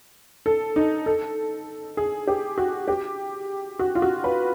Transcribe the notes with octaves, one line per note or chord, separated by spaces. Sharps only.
A4
D#4
A4
G#4
G4
F#4
G4
F#4
F4
F#4
B4